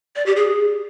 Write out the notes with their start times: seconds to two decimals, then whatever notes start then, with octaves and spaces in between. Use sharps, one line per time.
0.16 D5
0.26 G4
0.36 G#4